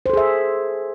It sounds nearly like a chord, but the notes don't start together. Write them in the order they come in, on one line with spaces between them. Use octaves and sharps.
C5 A4 G#4 E5